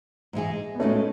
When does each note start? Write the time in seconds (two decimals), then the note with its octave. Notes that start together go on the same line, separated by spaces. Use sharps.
0.33 G#2 E3 G#3 D#4 G#4
0.75 B3
0.80 A2 G#3 A3 C#4 D#4 F#4